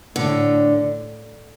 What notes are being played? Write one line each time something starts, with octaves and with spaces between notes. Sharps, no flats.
A2 D3